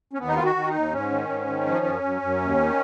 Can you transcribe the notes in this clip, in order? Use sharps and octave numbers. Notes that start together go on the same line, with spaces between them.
C#4
D#2 B3
D#4
D#3 F4
F#4
D#3
D#4
D#2
G#2 C#4
D#3
G#2
D#3
F3
F#2
F#2
F#2
D#2
D#3